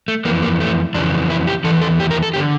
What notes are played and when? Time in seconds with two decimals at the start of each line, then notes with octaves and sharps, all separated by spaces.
0.08 A3
0.25 F2 E3 A#3
0.43 A#3
0.60 A3
0.94 F2 D4
0.97 C#3 E3
1.30 E4
1.47 G4
1.64 E2 E3 A4
1.81 A4
2.00 G4
2.11 A#4
2.23 A4
2.34 D3 G4